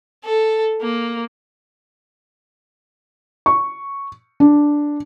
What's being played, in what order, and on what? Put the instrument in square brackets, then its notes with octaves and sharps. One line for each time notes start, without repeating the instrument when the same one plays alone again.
[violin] A4
A#3
[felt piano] C#6
D4